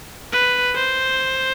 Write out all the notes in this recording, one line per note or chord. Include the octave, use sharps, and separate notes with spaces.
B4
C5